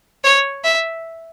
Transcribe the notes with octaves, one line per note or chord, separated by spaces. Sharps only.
C#5
E5